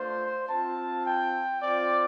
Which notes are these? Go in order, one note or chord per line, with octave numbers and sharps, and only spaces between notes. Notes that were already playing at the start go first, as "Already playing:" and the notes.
Already playing: A3 D4 F4 C5
C4 F4 A5
G5
C4 F4 D5